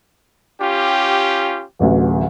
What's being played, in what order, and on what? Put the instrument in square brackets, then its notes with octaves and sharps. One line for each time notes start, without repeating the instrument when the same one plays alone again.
[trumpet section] C#4 F4 G4
[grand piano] D1 A1 D2